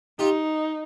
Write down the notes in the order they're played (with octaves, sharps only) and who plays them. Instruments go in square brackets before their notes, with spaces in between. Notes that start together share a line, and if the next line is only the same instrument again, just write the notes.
[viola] D#4 [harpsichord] F4 G4